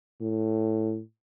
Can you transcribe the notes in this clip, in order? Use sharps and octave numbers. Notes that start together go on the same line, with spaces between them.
A2